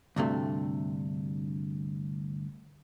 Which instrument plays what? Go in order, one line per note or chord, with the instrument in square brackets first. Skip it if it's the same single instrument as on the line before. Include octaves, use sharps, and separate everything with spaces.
[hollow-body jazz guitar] D2 G2 C3 A3